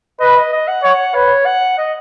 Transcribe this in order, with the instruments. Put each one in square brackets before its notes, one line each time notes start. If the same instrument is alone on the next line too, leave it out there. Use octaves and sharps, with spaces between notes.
[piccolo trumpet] B4 [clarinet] D#5
[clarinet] D#5
D#5
F#5
[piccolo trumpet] C#5 [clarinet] F#5
[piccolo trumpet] B4 [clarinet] C#5
[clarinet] F#5
D#5